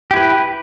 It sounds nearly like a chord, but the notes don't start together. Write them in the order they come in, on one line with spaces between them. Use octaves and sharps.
G4 E4 B4